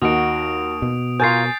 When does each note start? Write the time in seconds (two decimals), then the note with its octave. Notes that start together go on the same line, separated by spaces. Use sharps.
0.02 D#2 D#4 F#4 D#6 D7
0.82 B2
1.20 F4 A#4 C#5 G#5 G6 A6 C7